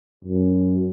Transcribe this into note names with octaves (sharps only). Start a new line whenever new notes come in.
F#2